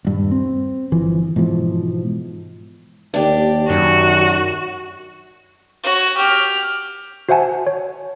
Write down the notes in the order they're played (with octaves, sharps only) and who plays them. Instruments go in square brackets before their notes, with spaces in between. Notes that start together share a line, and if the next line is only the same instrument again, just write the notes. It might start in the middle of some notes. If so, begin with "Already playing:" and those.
[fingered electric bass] D#1 G2
C4
G1 E3 F3
G#2 B2 E3 F3
[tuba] D#2 [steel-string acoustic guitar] D4 G4
[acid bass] F#2 [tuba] D#3 [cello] F#4
[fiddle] F#4 C#5
G4 F6
[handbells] F#4 C5 E5 F#5 G#5 A5
C#5